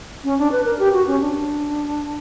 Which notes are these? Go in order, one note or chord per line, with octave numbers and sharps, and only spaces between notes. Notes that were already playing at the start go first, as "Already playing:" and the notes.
C#4
D4
B4
A#4
G4
F#4
C#4
D4